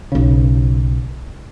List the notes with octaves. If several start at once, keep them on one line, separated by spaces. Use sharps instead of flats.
B1 C#3